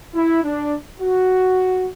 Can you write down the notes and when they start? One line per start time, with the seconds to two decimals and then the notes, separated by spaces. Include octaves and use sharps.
0.15 E4
0.44 D4
1.00 F#4